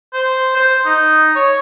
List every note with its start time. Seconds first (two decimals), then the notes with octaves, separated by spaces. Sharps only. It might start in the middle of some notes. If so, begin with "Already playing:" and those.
0.14 C5
0.56 C5
0.86 D#4
1.36 C#5